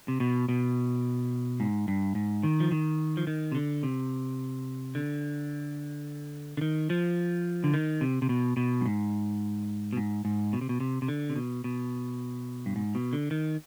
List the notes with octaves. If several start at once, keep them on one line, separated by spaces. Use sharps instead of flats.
C3
B2
B2
G#2
G2
G#2
D#3
F3
D#3
F3
D#3
C3
D3
C3
D3
D3
D#3
F3
D3
D#3
C3
C3
B2
B2
G2
G#2
B2
G#2
G#2
B2
C3
B2
C3
C3
D3
C3
B2
B2
G2
G#2
B2
D3
D#3